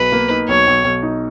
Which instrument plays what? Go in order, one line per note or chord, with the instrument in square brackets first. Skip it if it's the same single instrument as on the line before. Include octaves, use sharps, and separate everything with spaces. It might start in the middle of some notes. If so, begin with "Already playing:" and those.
Already playing: [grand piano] B1 [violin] B4
[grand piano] A#3
D#4
[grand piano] B1 [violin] C#5
[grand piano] B1
B1
D#4